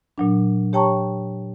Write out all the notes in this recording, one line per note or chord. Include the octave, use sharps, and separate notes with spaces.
A#2 F#3 D4
G4 C#5 G5 A5 A#5 C#6